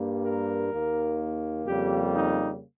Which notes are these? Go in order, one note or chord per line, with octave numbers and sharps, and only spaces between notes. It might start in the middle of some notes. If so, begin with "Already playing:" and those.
Already playing: G2 G3 A#3
A#4
D#2 D#3 A#3
F2 C#3 G3 A#3 G4
D#4